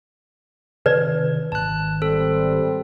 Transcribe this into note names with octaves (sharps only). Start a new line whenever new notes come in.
C3 D#3 E3 B4 D5
G#1 A5 F#6
G3 C4 A4